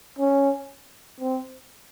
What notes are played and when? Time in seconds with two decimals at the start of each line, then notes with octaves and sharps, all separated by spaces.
0.19 C#4
1.20 C4